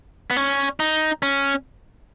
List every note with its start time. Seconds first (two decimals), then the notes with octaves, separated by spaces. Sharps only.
0.30 B3
0.37 C#4
0.80 D#4
1.23 C#4